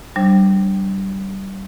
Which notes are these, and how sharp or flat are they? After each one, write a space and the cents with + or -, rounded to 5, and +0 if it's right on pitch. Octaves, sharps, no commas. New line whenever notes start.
G3 -25 D4 +0 C5 +25